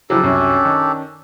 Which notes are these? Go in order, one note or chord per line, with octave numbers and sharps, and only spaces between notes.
C#3 F3 F#3 D4 E4 G4 A4
C2 F#2 C#4
D#3